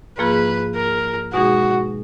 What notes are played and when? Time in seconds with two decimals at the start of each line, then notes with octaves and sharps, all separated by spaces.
0.19 G#2 F3 A#3 F4 G#4 B4
0.76 A#4
1.33 B2 G#3 D#4 F#4 G#4